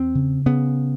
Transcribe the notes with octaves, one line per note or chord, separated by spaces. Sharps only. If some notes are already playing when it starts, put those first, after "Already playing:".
Already playing: E2 C4
C#3
C#3 B3